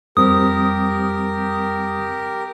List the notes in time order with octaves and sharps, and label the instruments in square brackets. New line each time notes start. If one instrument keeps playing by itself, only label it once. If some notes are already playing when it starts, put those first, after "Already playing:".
[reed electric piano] F2 G3 C4 [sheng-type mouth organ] G4 A#4 [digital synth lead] D#6